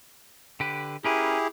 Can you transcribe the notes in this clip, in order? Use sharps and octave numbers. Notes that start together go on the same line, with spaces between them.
D3 G4 B4
C#4 E4 G4 G#4 A#4 B4